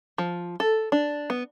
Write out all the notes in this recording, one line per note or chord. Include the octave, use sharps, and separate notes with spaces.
F3
A4
D4
B3